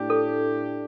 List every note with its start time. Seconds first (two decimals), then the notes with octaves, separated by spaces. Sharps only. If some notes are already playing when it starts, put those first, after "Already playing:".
Already playing: A2 A3 D4 G4
0.10 A4